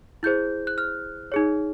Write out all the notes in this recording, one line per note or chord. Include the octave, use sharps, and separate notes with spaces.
E4 G#4 C5 G6
F#6
F6
D#4 G#4 C#5